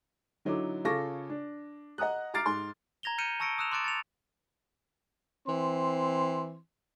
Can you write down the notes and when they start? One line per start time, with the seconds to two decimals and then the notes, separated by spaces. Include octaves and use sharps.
0.45 D3 F#3 D#4 E4 D6
0.85 C#3 F4 A4 C#6 D6 A#6
1.29 D4
1.98 D#5 F#5 A#5 D#6 F#6
2.34 A#5 D6 F6 A6 C7 D7
2.46 G#2 C6
3.03 A#5 G#6 A#6 F7 G7
3.18 F6 G6 C#7 D#7 E7
3.40 A5 C#6 E6 A#6 C#7 D7
3.58 D#6 E6 F#6 E7 F7
3.72 C6 D6 F#6 A6 D7 E7
3.84 A6 C#7 F7
5.48 E3 C4 C6